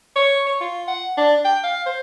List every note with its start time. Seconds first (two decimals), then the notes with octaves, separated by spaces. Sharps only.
0.16 C#5
0.47 C#5
0.61 F4
0.88 F#5
1.17 D4
1.45 G5
1.64 F5
1.86 C5